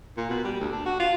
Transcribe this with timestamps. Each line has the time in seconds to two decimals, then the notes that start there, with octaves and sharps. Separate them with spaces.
0.17 A#2
0.30 B2
0.44 G3
0.60 D2
0.72 D4
0.86 F#4
1.00 F4